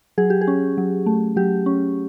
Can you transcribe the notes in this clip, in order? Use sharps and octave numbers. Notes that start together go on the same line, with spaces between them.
F#3 G#4
G4
G#4
C#4
F#3
A3
F#3 G4
C#4